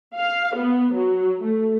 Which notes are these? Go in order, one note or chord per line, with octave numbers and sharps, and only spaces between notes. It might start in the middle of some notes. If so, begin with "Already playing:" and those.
F5
B3
F#3
A3